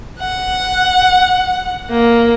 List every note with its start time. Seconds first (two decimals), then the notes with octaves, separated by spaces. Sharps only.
0.20 F#5
1.91 A#3